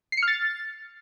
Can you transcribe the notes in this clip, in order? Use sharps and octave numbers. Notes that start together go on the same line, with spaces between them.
C7
C#7
F6
A6